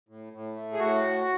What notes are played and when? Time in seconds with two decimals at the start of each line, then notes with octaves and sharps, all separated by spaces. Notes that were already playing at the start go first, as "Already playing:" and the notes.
0.09 A2
0.33 A2
0.56 A3
0.73 G#4
0.79 A2 F#4